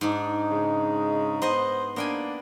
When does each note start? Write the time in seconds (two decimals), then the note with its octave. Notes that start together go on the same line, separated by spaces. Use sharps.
0.01 G#2 D4 D#4
0.49 C#3 G#3
1.42 B3 C5 D#5
1.96 A#3 B3 D4 G5 G#5